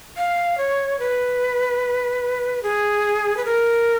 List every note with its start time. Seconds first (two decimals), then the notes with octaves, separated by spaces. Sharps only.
0.17 F5
0.58 C#5
0.99 B4
2.63 G#4
3.37 B4
3.45 A#4